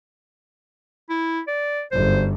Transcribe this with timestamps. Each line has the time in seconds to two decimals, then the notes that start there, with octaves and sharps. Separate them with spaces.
1.10 E4
1.48 D5
1.92 G1 F#2 C5